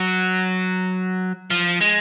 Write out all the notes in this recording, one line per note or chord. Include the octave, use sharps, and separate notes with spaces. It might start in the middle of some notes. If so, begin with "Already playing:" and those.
Already playing: F#3
F3
G#3